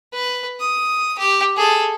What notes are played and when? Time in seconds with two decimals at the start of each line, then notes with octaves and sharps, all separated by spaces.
0.13 B4
0.60 D#6
1.18 G4
1.57 G#4 A4